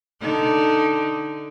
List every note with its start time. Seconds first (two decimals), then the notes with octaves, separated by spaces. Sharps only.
0.21 D3 D#4